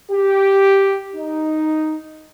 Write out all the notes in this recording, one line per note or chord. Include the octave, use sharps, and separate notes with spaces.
G4
D#4